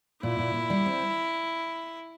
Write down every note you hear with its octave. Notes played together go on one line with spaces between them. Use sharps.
A#2 E4
A#2
A#2
G3
C4